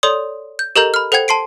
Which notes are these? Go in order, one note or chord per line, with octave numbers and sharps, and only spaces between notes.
A4 C#5 D5 C6 D#6
G6
G4 A4 A#4 D#5 A#5 G6
B5 F6
A4 C5 F#5 G5 G#6
A5 C6 C7 D7